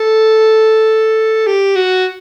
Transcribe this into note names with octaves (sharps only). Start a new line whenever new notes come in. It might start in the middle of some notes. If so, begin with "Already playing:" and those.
Already playing: A4
G4
F#4